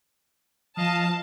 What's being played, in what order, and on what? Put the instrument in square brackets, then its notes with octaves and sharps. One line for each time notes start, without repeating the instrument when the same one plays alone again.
[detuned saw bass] F3 [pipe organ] D#5 F5 [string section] A5